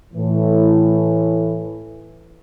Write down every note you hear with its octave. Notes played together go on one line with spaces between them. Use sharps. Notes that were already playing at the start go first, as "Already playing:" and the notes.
A2 E3